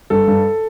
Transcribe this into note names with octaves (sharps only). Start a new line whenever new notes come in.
G2 A4
G2